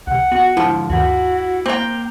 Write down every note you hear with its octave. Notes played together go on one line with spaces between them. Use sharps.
C#2 C3 F#5
B3 F#4
F2 G#2 D3 F3 E4
D2 G2 D#3 E4 F#4
A#3 C4 G5 A#5